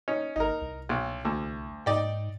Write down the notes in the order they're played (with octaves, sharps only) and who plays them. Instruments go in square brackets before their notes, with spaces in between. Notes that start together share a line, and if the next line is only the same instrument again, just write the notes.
[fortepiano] C#4 D#4
[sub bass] G#1 [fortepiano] D#4 A#4
[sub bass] C2
[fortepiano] B1
D2
[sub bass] G#2 [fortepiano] D#4 D5 G5